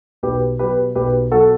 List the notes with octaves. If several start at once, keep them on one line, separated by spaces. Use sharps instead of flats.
B1 G4 B4
B2 F#3 G4 B4
B1 G4 B4
B2 F#3 F#4 A4